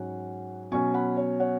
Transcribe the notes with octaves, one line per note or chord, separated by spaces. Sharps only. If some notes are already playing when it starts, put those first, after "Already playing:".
Already playing: G#2 F#3 C#4 F#5
B2 F#3 C#4 G#5 C#6
F#5 B5
C#5
C#5 F#5